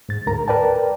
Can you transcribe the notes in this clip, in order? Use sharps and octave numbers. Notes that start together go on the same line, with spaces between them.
G#2 A6
D2 G#2 A#4 A#5
A#4 B4 D5 G5 A5